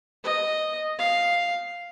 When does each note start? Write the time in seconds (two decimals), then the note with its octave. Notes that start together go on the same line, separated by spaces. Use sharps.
0.24 D#5
0.99 F5